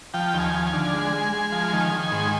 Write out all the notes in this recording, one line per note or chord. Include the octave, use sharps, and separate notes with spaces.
F3 G5
D#2
G#5
F3
G#5
D3
G#3
G#3
G#3
F3
D#3
D#3
G#2